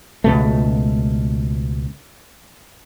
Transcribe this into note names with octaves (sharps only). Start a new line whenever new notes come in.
C#2 B2 A3